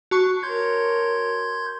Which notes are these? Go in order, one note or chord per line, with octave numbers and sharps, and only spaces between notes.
F#4 A5 C#6
A#4 C#5 C6 G6 G#6